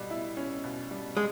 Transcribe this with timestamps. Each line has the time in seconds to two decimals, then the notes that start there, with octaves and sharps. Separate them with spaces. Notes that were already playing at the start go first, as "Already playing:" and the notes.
Already playing: B2 G3
0.10 E4
0.37 C#4
0.64 B2
0.91 G3
1.17 G#3